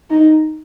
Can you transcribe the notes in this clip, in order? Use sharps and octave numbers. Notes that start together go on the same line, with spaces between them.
D#4